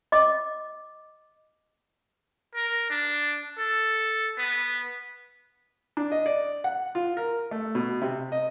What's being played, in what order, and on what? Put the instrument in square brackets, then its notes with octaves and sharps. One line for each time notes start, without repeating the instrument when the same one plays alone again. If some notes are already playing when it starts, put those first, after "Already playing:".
[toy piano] D#5 D6
[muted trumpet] A#4
D4
A4
B3
[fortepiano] D4
D#5
D5
F#5
F4
A#4
A3
B2
C3
D#5